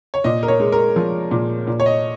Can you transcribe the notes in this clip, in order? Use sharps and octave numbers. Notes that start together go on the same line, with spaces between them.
C#5
A#2 D#5
A#4
C#5
G#3
A#4
F3
A#2
A#2
C#5
D#5